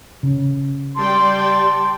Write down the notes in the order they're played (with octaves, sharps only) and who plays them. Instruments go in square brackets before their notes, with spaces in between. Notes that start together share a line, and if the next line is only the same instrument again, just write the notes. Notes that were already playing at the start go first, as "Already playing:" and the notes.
[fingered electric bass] C#3
[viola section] G3 D5 G5 [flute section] A5 C6